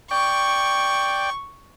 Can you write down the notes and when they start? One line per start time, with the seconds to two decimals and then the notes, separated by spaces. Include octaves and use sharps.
0.11 D5 G5 C#6